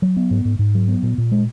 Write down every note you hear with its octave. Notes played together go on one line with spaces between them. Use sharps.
F#3
B3
G#2
G#2
G#2
F#3
B3
A#2
A#2
G#3